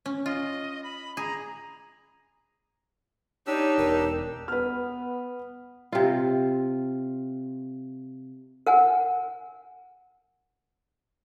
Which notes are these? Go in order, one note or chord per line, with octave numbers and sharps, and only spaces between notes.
C#4
F4 D#5
B5
G#4 A#5
D4 D#4 G4 C#5 E6
E1 A#4
B3 B4 F6
C3 F4
A#4 F#5 G#5